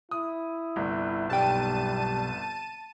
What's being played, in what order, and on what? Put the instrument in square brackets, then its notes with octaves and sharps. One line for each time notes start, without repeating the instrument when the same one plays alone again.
[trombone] E4 [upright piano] D#6
[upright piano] G1 C2
[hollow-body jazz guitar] B1 G5 [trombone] G3 [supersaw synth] A5 D#7